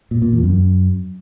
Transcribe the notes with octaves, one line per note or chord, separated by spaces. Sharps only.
A#2
A#2
E2
F#2